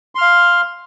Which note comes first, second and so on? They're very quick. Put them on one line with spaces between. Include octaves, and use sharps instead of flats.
C6 F6 F5